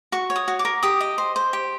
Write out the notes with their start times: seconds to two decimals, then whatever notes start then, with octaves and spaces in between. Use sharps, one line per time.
0.12 F#4 C#6
0.30 C#5
0.36 D#6
0.48 F#4
0.59 D6
0.65 A#4
0.83 G4 D#6
1.01 D#5
1.18 C5
1.36 C5
1.53 G4